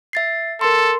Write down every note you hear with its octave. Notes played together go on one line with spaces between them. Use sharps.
E5 A6 C7
A4 A#4 C6